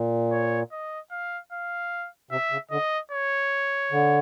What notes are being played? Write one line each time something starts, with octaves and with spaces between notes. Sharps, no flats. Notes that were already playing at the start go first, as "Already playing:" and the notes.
Already playing: A#2
C#5
D#5
F5
F5
C3 E5
C#3
D3 D#5
C#5
D3